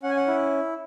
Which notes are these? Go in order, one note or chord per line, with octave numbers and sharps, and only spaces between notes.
C#4 F#5
G#5
F#5
E4